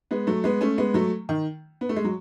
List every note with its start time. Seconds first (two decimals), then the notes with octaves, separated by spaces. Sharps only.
0.11 G#3 B3
0.27 F#3 A3
0.44 G#3 B3
0.61 A3 C#4
0.78 G#3 B3
0.94 F#3 A3
1.29 D#3
1.81 B3
1.89 A3
1.96 G#3
2.05 F#3